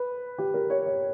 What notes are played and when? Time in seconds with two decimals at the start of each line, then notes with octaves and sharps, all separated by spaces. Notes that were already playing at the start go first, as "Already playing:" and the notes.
Already playing: B4
0.38 G4
0.54 A#4
0.70 C#5
0.86 C#5